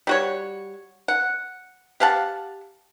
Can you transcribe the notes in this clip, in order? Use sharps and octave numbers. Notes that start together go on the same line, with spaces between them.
G3 F#4 C#5
F#5
G4 F5 F#5 A5